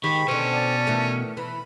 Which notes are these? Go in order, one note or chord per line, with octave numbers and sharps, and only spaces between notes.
G#2 D#3 G4 B5 C#6
B2 D3 C4 C#4
D5 A5
D#3 E3 A3
E3 B5